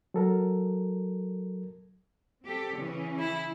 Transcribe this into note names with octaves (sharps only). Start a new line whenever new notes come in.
F#3 A4 A#4
C4 G4 A4
C#3 E3 C#4
E4